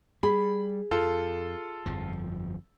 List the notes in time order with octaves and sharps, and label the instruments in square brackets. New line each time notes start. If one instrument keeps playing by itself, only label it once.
[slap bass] G3 [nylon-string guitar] G#4 [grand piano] B5
[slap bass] F2 [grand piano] F4 A4
[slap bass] G1 F2 F3